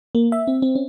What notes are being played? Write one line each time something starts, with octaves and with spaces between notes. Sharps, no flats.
A#3
E5
C4
C4
C#4